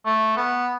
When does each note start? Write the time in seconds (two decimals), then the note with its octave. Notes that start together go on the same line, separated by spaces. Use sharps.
0.06 A3
0.36 B3